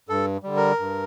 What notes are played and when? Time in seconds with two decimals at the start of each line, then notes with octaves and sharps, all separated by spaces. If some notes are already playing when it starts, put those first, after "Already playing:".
0.09 G2 A4
0.44 D3 G3
0.56 A#4
0.79 G2